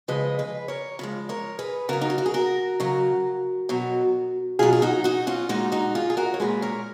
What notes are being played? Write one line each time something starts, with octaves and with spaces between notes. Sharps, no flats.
C#3 F3 G#3 B4 D#5
G#4 B4
A#4 C#5
C#3 F3 G#3
A#4 C#5
G#4 B4
C#3 F#3 F#4 A#4
D#4
F4
F#4
G#4
F#4 A#4
C#3 F#3
B2 F#3
B2 F#3 F4 G#4
G#4
D#4 F#4
D#4 F#4
C#4 F4
A#2 G#3 D#4 F#4
D#4 F#4
F4 G#4
G#4
F#4 A#4
C#5
A#2 G#3 G#4 B4
A#4 C#5